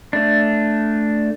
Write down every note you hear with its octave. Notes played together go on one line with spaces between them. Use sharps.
A3 D4